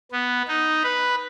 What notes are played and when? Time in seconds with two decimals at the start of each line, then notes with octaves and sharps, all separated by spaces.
0.12 B3
0.48 D#4
0.83 B4